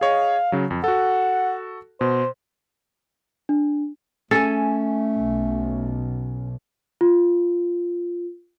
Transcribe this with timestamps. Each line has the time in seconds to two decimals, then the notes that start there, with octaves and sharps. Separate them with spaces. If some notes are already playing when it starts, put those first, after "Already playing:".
0.01 G#4 C#5 D#5 F5
0.52 C#3 F#3
0.70 F2
0.84 F#4 A4 F#5
2.01 B2 C5
3.49 D4
4.31 A3 C#4 A4 G#5
5.15 B1
7.01 F4